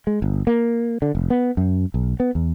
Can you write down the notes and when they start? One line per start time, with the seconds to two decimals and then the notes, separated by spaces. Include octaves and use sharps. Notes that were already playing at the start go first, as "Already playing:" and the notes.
0.07 G#3
0.22 G1
0.47 A#3
1.02 D3
1.15 F1
1.30 B3
1.57 F#2
1.94 B1
2.20 B3
2.35 E2